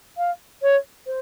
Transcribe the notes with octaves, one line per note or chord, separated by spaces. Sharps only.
F5
C#5
C5